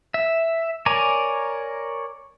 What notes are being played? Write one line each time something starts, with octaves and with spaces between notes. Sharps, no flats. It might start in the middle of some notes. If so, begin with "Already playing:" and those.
E5
A#4 C#5 D5 G#5 A#5